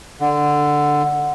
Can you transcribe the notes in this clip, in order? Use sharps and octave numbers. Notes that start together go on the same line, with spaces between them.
D3